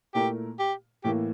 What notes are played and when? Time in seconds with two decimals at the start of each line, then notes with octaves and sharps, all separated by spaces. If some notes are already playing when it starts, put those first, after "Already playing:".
0.14 A#2 A3 E4 G4 A#4
0.59 G4
1.04 A2 E3 A#3 G4